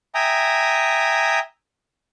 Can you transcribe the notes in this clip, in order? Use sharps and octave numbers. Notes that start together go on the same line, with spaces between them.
E5 G5 G#5 A#5 D#6